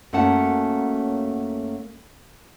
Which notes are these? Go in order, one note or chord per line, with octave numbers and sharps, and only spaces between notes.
F#2 A3 A#3 C#4 F#5 A5